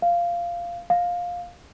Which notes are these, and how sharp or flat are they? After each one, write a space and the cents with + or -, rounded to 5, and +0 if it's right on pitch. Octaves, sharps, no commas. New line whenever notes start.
F5 -10
F5 +15